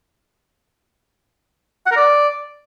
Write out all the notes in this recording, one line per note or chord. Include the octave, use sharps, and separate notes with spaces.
F#5
A#4
D5